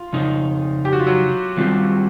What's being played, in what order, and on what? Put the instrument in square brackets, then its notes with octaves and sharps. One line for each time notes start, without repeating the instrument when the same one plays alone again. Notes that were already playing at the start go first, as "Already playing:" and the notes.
Already playing: [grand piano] F4
[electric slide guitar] F2 C#3 D#4
[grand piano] G4
F#4
F4
F#3 F#4
[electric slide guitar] D#3 G3 C4 F4